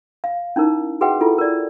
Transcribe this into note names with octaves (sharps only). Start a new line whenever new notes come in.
F5
C#4 D#4 E4 A#4
F#4 G#4 B4 E5 F#5 G5
E4 F4 A4
A#4 D5